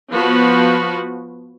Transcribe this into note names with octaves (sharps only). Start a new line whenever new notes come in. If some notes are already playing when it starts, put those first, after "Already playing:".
F3 B3 F#4 B4